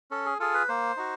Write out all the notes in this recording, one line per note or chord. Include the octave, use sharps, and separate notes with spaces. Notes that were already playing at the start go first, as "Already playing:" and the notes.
C#4 A4
G#4
F4 G#4 A4
B4
A#3 C5
D#4 F#4